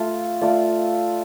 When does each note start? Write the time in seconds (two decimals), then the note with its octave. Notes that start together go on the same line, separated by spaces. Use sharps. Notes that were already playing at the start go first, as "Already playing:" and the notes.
Already playing: A3 F4
0.41 A3 F4 D5